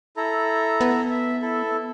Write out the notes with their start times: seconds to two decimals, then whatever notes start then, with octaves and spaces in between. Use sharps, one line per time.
0.17 E4 A4 A#5
0.81 B3
1.10 E5
1.42 E4 A4